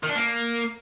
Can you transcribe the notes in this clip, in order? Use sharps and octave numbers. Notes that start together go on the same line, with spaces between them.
D#3
D4
A#3